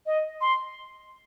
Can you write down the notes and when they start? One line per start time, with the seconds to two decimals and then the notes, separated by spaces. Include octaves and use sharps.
0.06 D#5
0.41 C6